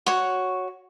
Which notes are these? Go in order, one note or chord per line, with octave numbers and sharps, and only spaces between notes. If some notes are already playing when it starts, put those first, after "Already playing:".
F#4 C#5